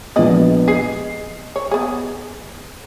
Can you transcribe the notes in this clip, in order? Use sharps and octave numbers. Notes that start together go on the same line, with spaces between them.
A#1 G#3 B3 D5 D#5
G#4 D#5 C7
C#5
B3 G#4